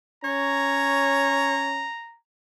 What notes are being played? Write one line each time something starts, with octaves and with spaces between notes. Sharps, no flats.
C#4 C#5 A#5